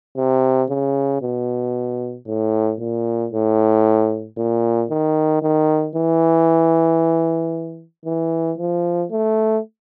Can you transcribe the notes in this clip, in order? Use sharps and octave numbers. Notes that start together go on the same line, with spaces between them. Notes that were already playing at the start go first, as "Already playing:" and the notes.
C3
C#3
B2
A2
A#2
A2
A#2
D#3
D#3
E3
E3
F3
A3